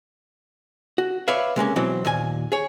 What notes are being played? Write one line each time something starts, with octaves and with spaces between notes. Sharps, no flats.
F#4
B4 C#5 D5 E5 F5
C3 G#3 A#3 C#4
B2 E3 F#3 C4
D#2 A#2 G#5
G#4 C#5